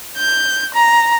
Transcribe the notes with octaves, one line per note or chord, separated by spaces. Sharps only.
G6
A#5